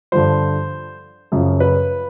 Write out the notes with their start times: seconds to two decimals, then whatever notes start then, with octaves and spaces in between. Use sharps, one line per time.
0.12 G2 D3 F3 C5
1.32 F#2 C#3 F3
1.60 B4